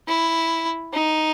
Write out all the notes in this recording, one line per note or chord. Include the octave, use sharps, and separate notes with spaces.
E4
D#4